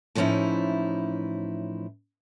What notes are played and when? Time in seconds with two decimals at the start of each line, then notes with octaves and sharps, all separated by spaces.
0.15 A2 E3 F3 C#4 D#4 E4